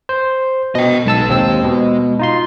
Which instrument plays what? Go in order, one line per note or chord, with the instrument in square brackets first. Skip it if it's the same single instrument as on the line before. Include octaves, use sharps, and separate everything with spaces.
[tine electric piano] C5
[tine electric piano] B2 [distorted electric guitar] D#5 G5
[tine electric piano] B1 A5 E6 [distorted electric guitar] G#3
[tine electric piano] D#2 C4 E6
B2
D#4 F4 C6